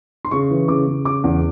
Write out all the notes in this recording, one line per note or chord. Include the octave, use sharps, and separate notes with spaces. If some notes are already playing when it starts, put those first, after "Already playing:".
C6
C#3 C#6
E3
C#3 D6
C#3
C#3 D6
E2